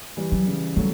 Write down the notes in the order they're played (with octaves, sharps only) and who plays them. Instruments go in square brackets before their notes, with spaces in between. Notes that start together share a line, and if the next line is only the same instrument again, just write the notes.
[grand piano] E3 G3
[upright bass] F#3
[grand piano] C#3 E3
[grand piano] F#3 A3 [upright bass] G3